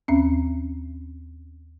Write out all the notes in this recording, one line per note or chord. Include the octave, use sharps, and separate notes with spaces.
D#2 C4 C#4